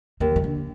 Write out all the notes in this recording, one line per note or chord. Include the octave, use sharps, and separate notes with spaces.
D#2 D#3
D#3
D3